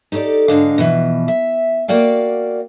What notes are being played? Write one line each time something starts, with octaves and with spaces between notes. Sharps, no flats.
D#4 G4 A4 C5 D5
G#2 D3 D4 D#5 F5
B2 E3 F3
E5
A#3 F#4 D5 F5 G5